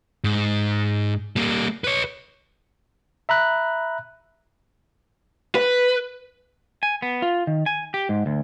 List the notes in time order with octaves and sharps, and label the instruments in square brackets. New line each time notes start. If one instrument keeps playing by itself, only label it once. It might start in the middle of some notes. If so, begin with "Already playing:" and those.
[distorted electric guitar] G#2
G3 A#3
B4 C#5
[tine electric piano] E5 A#5 B5 F#6
[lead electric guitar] B4
[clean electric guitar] G#5
B3
F4
D#3
G#5
G4
G#2
D2